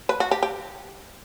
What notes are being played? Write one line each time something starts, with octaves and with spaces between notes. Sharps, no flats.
B4
F#4
G4
G4